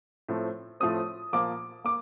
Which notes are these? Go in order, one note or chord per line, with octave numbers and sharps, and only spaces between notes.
A2 F3 A3 C4
A2 F3 A3 C4 D#6
A#2 F3 A#3 D6
A#3 D6